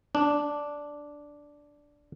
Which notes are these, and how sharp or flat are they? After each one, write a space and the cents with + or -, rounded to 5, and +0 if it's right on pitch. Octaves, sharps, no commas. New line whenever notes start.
D4 -5